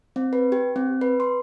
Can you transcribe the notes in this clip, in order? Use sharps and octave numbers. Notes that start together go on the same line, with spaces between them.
C4
B4
G4
C4
B4
C6